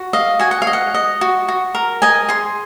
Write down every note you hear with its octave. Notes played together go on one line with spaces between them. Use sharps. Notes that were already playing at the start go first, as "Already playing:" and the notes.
Already playing: F#4
D#5 F5
F#4 G#5
F#5
F5
D#5
F#5
D#5
F#4
F#4
A#4
D#5 G#5
G#4 C6